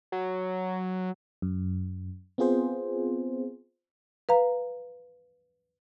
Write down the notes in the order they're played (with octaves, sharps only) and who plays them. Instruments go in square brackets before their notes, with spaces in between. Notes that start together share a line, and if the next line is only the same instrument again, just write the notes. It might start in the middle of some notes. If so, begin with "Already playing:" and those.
[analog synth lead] F#3
[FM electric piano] F#2
B3 C4 F4 G#4 C5
[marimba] B4 F5 A#5